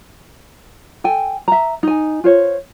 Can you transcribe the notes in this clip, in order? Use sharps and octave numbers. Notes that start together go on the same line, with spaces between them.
A4 G5 G#5
E5 A#5
D#4 G#5
F4 C5 C#5